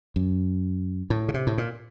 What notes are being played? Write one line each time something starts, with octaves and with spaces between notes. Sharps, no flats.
F#2
A2
C#3
C3
A2
A#2